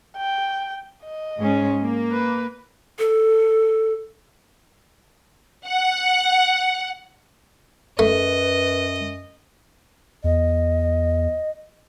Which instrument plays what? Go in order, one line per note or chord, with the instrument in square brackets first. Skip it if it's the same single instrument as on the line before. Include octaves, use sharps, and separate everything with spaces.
[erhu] G5
D#5
[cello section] G#2 G#3 C#4
A#3
[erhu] B4
[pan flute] A4
[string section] F#5
[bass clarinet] F#2 [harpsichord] A3 [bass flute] B4 [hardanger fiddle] D#5
[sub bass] E2 [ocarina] D#5